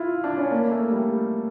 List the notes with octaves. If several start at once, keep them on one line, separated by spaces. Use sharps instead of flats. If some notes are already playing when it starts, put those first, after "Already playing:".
Already playing: E4 F4
D4
C#4
A#3
A3
G3